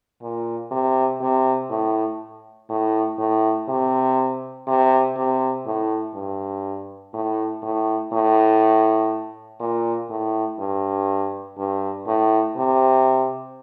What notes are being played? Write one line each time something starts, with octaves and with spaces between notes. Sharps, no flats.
A#2
C3
C3
A2
A2
A2
C3
C3
C3
A2
G2
A2
A2
A2
A#2
A2
G2
G2
A2
C3